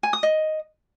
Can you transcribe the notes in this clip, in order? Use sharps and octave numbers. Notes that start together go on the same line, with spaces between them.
G#5
D#6
D#5